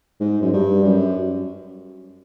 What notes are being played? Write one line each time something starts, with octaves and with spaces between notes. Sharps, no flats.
G#2
F#2
G2
F#2